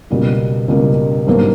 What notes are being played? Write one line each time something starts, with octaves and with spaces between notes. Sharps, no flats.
C#2 B2 G3 A#3
C#2 B2 G3 A#3
G#1 G2 D#3 F#3 A#3